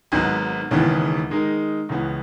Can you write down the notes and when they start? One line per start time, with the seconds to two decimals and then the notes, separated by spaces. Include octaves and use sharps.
0.12 G#1 G#2 F#3 B3
0.71 E1 D#2 C#3 E3 B3
1.30 D#3 G#3 D#4 A#4
1.89 C#2 C#3 E3 B3